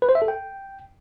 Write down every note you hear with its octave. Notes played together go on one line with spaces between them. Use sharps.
B4
C5
E5
A4
G5